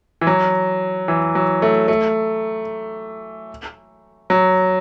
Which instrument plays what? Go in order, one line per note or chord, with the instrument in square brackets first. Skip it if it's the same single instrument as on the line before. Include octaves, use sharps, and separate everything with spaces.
[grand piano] E3
F#3
E3
F#3
A3
A3
F#3